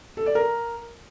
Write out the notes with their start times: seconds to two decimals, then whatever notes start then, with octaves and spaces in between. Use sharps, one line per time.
0.17 A4
0.26 D5
0.35 A#4